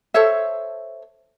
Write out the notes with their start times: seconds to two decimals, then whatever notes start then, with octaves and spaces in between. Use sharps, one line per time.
0.14 A4 C5 C#5 E5